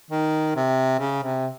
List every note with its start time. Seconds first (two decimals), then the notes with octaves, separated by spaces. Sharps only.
0.11 D#3
0.56 C3
1.00 C#3
1.23 C3